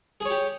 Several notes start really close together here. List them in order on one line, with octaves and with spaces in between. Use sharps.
G#4 C#5 G4